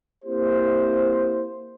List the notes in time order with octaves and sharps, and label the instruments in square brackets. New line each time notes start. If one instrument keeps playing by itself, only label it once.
[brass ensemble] A#3 C4 E4 G4 C5